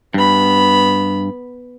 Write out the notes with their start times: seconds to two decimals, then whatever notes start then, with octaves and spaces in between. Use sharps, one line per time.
0.14 G2 B3 B5